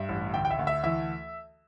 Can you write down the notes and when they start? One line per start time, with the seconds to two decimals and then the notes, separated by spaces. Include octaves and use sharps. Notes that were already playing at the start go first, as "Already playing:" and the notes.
Already playing: G2 E5
0.09 A1
0.33 D2 G5
0.45 G5
0.50 E5
0.59 D2
0.67 E5
0.84 E3 E5